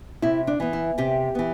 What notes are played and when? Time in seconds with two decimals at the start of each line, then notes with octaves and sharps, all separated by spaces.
0.22 C3 E4
0.47 D4
0.60 E3 B3
0.73 E4
0.98 C3 G4
1.35 E3 B3